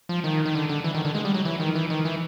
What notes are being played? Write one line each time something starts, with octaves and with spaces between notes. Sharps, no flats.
F3
D#3
D#3
D3
D3
E3
D#3
D3
G#3
G3
F#3
E3
D#3
E3
D#3
E3